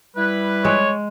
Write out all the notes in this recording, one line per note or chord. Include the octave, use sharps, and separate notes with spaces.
G3 E4 B4
G#3 C#5